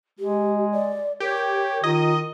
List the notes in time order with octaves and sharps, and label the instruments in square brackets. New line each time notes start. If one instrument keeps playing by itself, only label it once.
[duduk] G#3 [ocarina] G4
[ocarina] D5
[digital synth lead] G4 [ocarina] A#4 [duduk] C#5
[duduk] D#3 [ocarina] F4 [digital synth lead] D#5